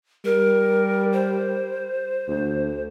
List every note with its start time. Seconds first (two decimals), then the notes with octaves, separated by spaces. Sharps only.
0.25 G3 A#4
1.13 C5
2.28 D2